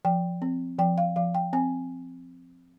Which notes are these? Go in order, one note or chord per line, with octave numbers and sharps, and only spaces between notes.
F3 G5
C4
F3 G5
F5
F3 F5
G5
C4 G#5